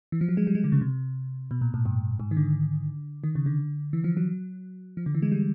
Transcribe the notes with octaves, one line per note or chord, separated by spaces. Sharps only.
E3
F3
F#3
G#3
G3
G#3
D3
C#3
C3
B2
A#2
A2
G2
G#2
D#3
D3
D#3
C#3
D3
E3
F3
F#3
F3
D3
E3
G#3
G3